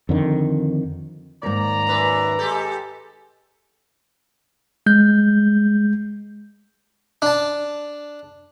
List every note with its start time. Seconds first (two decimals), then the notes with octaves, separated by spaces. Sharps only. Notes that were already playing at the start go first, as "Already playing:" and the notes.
0.09 F2 D3 D#3
1.43 D#2 G#2 D5 A#5
1.87 F#2 B4
2.39 G#3 G4 A4
4.86 G#3 G6
7.22 D4 A5